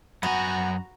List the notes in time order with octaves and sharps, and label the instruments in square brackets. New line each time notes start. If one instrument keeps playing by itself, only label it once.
[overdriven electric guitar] F#2 G#5 [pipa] B3 [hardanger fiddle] F#4 A#5